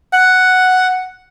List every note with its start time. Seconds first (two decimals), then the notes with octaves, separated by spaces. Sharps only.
0.13 F#5